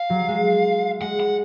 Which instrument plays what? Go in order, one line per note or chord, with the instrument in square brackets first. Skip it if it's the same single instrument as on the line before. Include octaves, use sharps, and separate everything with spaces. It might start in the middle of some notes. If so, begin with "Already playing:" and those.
Already playing: [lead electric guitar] F5
[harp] F#3
G#3
[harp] G#3 [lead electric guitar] F#5
[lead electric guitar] F#5